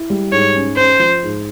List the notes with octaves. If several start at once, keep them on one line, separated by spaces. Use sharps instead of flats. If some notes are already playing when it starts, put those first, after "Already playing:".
Already playing: E4
G3
G#2 C#5
C#4
C#4 C5
F3
G#2